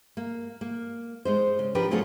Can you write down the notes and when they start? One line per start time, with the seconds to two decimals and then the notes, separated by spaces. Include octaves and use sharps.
0.17 A#3
0.61 A#3
1.25 G#3 D#4 C5
1.59 C#3
1.75 F3 D4 G4 A#4 B4
1.91 F#3 A3 F4 G#4 A#4 C#5